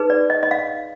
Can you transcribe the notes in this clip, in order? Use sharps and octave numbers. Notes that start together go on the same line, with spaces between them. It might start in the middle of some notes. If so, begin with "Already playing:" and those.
Already playing: D#4 G#4 B4
D5
D#5
D#5
F5